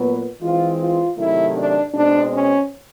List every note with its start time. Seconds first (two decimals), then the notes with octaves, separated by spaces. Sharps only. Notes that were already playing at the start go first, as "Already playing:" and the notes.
Already playing: A#2 F#3 B3
0.41 E3 G#3 C4 F4
0.80 F4
1.18 C3 D#3 F#3 A3 E4
1.56 D4
1.94 B2 G#3 C4 D4
2.32 C#4